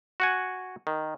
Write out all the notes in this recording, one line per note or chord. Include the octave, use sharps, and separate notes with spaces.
F#4 F#5 G#5
D#3